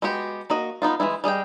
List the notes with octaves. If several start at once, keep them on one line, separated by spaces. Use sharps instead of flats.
G#3 B3 F#4 G4
A#3 F#4 D#5
B3 D#4 F4
E3 F3 G#3 E4
G3 G#4 D#5 G5